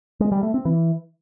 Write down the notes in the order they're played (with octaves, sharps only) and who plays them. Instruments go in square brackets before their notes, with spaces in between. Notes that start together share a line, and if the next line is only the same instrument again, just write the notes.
[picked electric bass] G#3
G3
A3
C4
E3